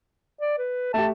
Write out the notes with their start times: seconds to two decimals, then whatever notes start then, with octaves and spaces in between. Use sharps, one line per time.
0.41 D5
0.58 B4
0.94 A3 G4 A5